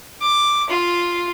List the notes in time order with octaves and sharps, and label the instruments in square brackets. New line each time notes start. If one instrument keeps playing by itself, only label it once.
[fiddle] D6
F4